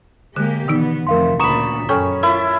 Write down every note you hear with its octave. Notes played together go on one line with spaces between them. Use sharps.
D3 G#3 A#3 G4 F#6
B2 D#3 E3 B3 D#4
F2 C3 A3 A#4 F5 C6
D2 A#2 C#3 A#5 B5 C#6 D#6 E7
F#2 C#4 A4 G5 C#6
E4 F4 A#4 E5